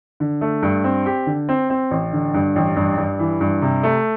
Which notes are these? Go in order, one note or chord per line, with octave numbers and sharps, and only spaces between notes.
D3
A3
G2
C4
G4
D3
C4
C4
A1
D3
G2
A1
G2
G2
E3
G2
C3
A3